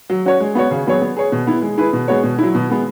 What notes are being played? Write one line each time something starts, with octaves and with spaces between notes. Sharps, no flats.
F#3
C#4 F#4 C#5
G#3
B3 F#4 C#5
C#3
F#3 B3 G#4 C#5
B3
G#4 C#5
B2
B3 E4
G#3
E4 G#4 B4
B2
G#3 B3 F#4 C#5
B2
F#3 E4
B2
G#3 B3